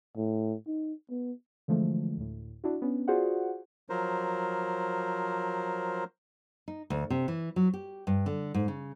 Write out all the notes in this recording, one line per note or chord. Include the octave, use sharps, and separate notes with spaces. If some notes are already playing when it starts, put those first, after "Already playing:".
A2
D#4
B3
D3 E3 F3 G#3 A3
D2 A2
D4 E4 F#4
B3 C#4 D4
F4 F#4 G#4 C5 D5 F#5
F3 F#3 A#4 C5
D#4
D2
C3
E3
F#3
G4
G2
D3
G#2
C#3